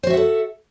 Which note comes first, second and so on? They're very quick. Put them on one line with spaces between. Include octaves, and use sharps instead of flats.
C5 F#4 E5 F#5 A4